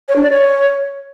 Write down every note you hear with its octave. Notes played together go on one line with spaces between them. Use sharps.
C#5
D4
D5
C#5